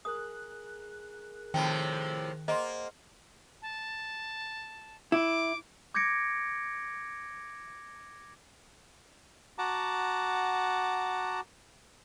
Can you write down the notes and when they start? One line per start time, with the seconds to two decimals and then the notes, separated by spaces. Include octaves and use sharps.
0.05 G#4 A#4 D#6 F#6
1.54 A2 C3 D#3 F3 G5 A5
2.48 A#3 G#4 C5 D#5 F#5 C6
3.62 A5
5.12 E4 D6
5.94 D6 G6 G#6 A#6 C#7 D7
9.58 F#4 F#5 A5 A#5 D6